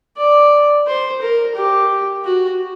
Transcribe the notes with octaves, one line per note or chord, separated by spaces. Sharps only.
D5
C5
A#4
G4
F#4